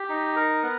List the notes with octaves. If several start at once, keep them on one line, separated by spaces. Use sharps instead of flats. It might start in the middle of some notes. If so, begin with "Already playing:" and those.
Already playing: G4
D#4
A#4
B3